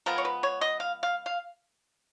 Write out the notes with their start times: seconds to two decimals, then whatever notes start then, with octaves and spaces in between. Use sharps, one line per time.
0.06 F3 G#3 B3 A#4
0.18 C#5
0.25 B4
0.43 C#5
0.61 D#5
0.80 F5
1.03 F5
1.26 F5